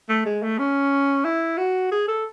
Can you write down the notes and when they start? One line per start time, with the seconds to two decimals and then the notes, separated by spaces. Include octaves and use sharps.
0.09 A3
0.26 G#3
0.43 A3
0.59 C#4
1.25 E4
1.58 F#4
1.92 G#4
2.08 A4